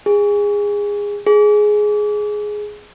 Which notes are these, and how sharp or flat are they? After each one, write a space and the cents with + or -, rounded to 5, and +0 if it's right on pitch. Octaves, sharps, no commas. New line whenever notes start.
G#4 -20
G#4 +10